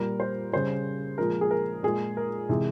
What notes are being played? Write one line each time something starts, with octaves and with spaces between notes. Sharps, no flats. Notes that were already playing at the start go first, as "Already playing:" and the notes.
Already playing: A#2 G3 A#4
C5
C#3 G3 C5
A#2 F3 G#3 A#4
G#4
A#4
A#2 G#3 G#4
A#4
C3 E3 G#3